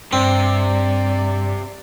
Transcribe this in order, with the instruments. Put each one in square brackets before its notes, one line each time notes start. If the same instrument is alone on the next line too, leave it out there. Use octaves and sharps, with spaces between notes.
[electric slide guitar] G2 [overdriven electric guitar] C3 [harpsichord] C4 [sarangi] D5